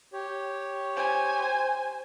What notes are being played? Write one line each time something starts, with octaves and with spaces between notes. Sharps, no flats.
G4 C#5
C5 G#5